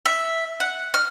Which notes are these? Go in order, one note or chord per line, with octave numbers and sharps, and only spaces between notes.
E5
F#5
F6